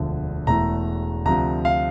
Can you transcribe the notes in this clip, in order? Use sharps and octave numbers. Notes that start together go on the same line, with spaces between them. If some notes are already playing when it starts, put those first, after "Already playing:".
Already playing: E1 D2 D3 F3
E1 E2 E3 A3 A#5
D2 C3 F3 A#5
F5